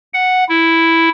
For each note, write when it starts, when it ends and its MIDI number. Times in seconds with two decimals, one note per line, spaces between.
0.13 0.44 78
0.49 1.09 64